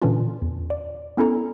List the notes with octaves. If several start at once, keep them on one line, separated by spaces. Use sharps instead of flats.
A#2 D3 E3 C#4 D4 F4
E2
D5
B3 C#4 E4 A4 A#5